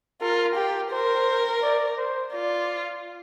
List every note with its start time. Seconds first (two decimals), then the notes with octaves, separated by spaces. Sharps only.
0.21 F4 A#4
0.56 G4
0.91 A#4 C5
1.62 D5
1.97 C5
2.32 F4 D5